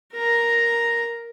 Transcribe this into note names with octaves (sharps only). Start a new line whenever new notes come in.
A#4 A#5